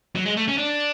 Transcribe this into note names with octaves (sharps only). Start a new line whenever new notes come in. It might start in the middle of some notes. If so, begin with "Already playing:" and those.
F#3
G#3
A3
C#4
D4